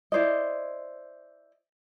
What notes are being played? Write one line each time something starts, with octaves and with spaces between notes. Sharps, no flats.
E4 C5 D5 D#5